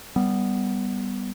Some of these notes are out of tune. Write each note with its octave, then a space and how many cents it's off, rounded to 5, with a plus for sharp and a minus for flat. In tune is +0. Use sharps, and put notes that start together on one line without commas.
G3 +0 B3 +0